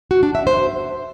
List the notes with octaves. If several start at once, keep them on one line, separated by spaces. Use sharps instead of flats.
F#4
D4
E5
C5